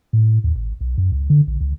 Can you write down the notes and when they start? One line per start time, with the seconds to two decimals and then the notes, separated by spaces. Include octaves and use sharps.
0.13 A2
0.44 D#2
0.55 G#1
0.81 B1
0.98 F#2
1.12 C#2
1.30 D3
1.47 A#1
1.61 C#2